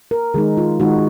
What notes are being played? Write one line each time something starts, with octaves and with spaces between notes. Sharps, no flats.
A#4
D#3 G#3 D#4 G#4
F4
D#3 G#3 D#4 F#4